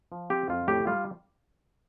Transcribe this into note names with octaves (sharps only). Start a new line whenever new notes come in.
F3
C4 G4
F2 F4
A2 G4
G3 F4